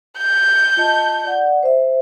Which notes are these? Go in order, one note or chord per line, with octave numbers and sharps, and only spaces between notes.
G6
F4 D#5 A5
D5 F#5
C5 E5